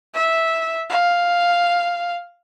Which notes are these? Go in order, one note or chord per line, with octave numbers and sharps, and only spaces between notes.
E5
F5